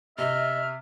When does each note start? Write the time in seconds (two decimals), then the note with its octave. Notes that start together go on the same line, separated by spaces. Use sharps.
0.18 C3 D#5 E5 F6